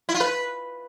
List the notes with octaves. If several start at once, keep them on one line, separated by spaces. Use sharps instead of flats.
E4
F4
B4